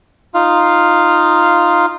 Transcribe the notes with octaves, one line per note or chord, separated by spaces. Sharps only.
D#4 F4 F5